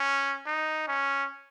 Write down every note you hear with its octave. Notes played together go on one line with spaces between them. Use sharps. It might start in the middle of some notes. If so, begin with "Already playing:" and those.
Already playing: C#4
D#4
C#4